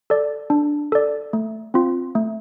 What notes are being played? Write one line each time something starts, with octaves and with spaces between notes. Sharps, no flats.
A4 D5
D4
A4 D5
A3
C4 F4
A3